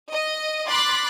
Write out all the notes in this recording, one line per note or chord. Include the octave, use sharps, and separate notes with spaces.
D#5
B5 C6 D6 F#6 A6 B6